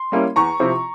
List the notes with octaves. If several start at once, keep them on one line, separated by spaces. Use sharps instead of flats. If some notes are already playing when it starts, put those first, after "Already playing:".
Already playing: C6
G3 A#3 C#4 E4
E2 A#5 C#6
C3 F3 C4 E4